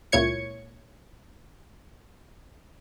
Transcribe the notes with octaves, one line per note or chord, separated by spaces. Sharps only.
C#2 A#2 E4 C#5 G#6 C#7